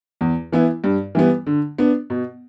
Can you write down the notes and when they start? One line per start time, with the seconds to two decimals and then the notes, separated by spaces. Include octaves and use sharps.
0.21 E2
0.52 E3 B3 E4
0.84 G2
1.15 E3 G3 B3
1.46 D3
1.78 B3 D4
2.10 B2